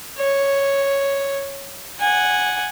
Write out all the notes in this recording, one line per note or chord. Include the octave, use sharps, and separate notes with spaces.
C#5
F#5 G#5